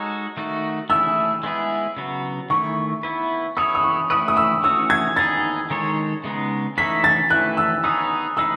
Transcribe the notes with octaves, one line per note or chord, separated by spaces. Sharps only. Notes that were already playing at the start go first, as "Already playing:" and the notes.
Already playing: G#3 D#4 F#4 A4 C#5
D#3 A3 D#4 F#4
A3 E4 G#4 E6
G#3 B3 E4 G#4
C#3 F#3 B3 F#4
D#3 A3 E4 C#6
B3 E4 B4
B3 E4 A4 C#5 D#6
D#6
C#6
A3 E4 B4 D#6
D#6
E6
E3 A3 C#4 F#4 E6
G#6
B3 D#4 G#4 A6
D#3 G#3 D#4 A4 C#5
C#3 G#3 B3 D#4
E3 A3 D#4 A4 C#5 B6
A6
E3 A3 E4 F#6
E6
B3 D#4 G#4 C#5 D#6
A3 D#4 G#4 B4 E6